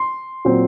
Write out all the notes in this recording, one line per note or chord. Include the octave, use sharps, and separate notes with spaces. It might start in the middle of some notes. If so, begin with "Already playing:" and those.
Already playing: C6
A#2 F#3 C4